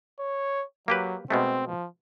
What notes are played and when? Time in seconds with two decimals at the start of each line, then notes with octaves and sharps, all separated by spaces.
0.19 C#5
0.88 F#3 A#3 G4 B4
1.30 B2 G#3 A3 C4
1.67 F3